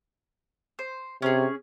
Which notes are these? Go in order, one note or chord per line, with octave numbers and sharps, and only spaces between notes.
C5
C3 C#4 G#4